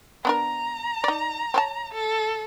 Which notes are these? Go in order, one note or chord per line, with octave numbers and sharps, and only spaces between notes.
B3 D4 A#4 A#5
D#4 D5
C4 C#5 A5
A4